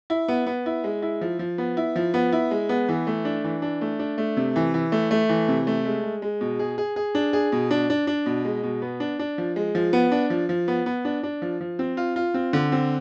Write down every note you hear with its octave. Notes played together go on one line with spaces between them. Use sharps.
E4
B3
B3
E4
G#3
E4
F3
F3
B3
E4
F3
B3
E4
G#3
B3
E3
A3
D4
E3
D4
A3
D4
A3
C3
E3
E3
A3
A3
E3
C3
A3
G#3
G#3
G#3
B2
G#4
G#4
G#4
D4
G#4
B2
D4
D4
D4
B2
G#3
B2
B3
D4
D4
F3
G#3
F3
B3
D4
F3
F3
B3
B3
D4
D4
F3
F3
C4
F4
F4
C4
D3
C4